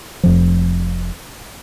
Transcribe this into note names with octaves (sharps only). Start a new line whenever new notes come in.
F1 F2 F3